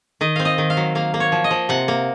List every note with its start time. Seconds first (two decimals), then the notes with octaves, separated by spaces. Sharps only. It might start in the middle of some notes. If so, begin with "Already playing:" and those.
0.21 D#3 D#5
0.36 C4 F5
0.45 D#5
0.58 D#3
0.70 F5
0.77 F#3
0.95 A#3 F5
1.14 A#3
1.20 C#5
1.32 F3
1.44 D#5
1.51 F3
1.69 C3 F#5
1.88 A#3